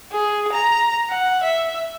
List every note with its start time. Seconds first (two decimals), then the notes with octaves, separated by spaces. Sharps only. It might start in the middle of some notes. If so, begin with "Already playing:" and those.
0.12 G#4
0.52 A#5
1.10 F#5
1.43 E5